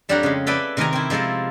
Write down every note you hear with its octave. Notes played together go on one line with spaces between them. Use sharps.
F2 G3 D4 C#5 F#5 A#5
C#3 G#3
A4 B4 D5 E5 G5 G#5
C3 D#3 A#4 D#5 G#5 A#5
C4 E4
F3 G#3 E4 A4 A#4